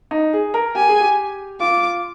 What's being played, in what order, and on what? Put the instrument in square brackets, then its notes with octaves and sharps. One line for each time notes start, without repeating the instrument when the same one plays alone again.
[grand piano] D#4
G#4
A#4
[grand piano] G4 [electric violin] G#5
[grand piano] G#4
G4
[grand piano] F4 [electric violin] D6